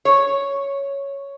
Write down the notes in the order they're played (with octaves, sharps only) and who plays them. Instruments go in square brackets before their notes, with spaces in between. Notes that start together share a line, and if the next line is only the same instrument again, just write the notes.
[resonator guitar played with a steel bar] C#5